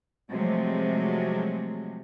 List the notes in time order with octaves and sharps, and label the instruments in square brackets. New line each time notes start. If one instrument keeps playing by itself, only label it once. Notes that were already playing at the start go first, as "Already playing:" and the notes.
[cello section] C3 F3 F#3 G#3 A3